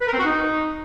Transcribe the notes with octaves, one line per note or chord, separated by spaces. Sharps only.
B4
A#4
C4
F#4
D#4